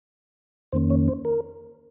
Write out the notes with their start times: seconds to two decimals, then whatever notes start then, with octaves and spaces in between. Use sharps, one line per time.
0.72 F2 D#3 A#3 C#4 C5
0.90 C#5
1.08 C5
1.25 A#4